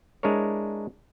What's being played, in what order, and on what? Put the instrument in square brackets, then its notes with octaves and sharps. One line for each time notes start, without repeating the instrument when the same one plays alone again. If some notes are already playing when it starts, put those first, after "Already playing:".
[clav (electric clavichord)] G#3 D4 E4 A#4 C#5